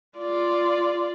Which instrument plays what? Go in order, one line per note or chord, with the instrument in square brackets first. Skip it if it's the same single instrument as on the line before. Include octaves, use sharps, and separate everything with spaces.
[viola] F4 D5